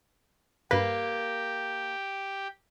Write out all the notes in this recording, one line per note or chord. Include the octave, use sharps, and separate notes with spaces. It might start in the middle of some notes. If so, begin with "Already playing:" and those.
G2 A#3 G4 B4